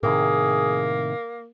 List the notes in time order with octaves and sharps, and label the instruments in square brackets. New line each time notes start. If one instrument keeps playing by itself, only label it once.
[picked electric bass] A2 C3 D#3 [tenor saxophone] A#3 [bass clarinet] G#4